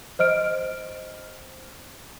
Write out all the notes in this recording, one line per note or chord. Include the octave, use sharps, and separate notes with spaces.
C5 D#5 F6 D7